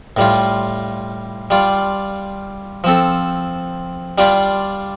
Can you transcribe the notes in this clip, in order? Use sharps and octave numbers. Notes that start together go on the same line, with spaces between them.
A2 G3 F4
G3 F4 D5
F3 C4 A4
G3 D4 F4 D5